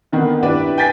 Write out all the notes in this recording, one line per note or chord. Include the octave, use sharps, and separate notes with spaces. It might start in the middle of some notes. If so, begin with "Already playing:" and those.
D3 D#3 B3
D4 E4 G4 B4 D5 E5
G5 G#5 G6 A6 B6